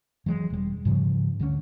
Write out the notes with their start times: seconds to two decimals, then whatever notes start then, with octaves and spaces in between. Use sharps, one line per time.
0.26 E3 F#3 G#3
0.50 E1 G3
0.85 G#2 C#3 F3 G3
1.40 D2 D3 G3 C#4